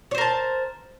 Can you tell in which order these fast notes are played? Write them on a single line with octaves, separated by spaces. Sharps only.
C#5 C5 A#4 A5